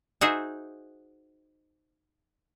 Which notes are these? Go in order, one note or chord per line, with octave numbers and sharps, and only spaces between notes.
D#4 F#4 G#4 C5 E5 G#5